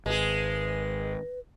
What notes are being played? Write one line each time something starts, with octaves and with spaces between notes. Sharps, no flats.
G#1 G#3 G#4 B4